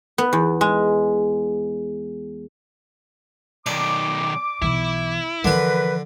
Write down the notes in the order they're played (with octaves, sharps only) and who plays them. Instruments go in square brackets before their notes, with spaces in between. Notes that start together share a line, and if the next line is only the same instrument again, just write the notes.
[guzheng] B3
E2
G#3
[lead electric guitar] B1 D#3 [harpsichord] D5 [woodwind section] D6
[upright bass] B1 E3 [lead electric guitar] E4
[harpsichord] D3 G#5 [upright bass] E3 F3 [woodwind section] A#4 B4